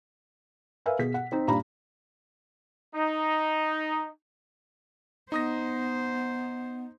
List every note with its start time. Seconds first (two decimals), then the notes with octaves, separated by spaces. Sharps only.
0.86 A#4 B4 E5 F5 G#5
0.99 B2 G#4 B6
1.14 F#5
1.32 C4 D#4
1.47 G2 A#2 A#5 B5
2.94 D#4
5.32 B3 D#4 C5 D#6 A#6